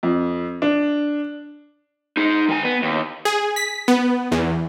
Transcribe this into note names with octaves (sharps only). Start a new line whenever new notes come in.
F2
D4
D#4 G#4
D#3 G#5
B3
D#2
G#4
B6
B3
E2